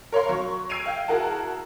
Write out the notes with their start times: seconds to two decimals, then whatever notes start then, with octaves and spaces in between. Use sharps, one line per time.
0.12 A#4 C#5 F5 C6
0.29 F#3 C#6
0.70 E6 G#6 C7 D7 D#7 F7
0.86 F5 G5
1.08 E4 F#4 G#4 A#4 F#5 A5